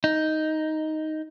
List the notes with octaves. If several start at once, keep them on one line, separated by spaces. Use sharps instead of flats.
D#4